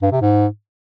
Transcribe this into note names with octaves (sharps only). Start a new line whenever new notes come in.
G2
C3
G#2